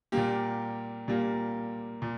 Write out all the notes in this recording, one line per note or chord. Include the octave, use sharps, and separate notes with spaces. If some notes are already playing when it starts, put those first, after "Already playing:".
A#2 G3 A#3 G4
A#2 G3 A#3
A#2